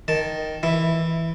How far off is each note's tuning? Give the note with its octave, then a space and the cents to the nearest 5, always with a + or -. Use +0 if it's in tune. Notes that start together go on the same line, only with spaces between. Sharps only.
D#3 +0 A5 +0
E3 -10 E4 +0